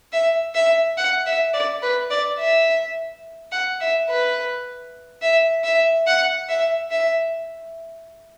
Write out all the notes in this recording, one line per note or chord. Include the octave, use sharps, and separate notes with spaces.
E5
E5
F#5
E5
D5
B4
D5
E5
F#5
E5
B4
E5
E5
F#5
E5
E5